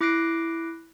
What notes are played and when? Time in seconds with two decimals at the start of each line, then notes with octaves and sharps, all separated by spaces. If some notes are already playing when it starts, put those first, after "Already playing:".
0.01 E4 D6 F#6 A#6 C7 D7